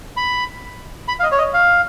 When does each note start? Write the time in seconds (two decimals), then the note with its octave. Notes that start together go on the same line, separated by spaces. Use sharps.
0.17 B5
1.08 B5
1.20 F5
1.23 D#5
1.32 C#5
1.38 D#5
1.54 F5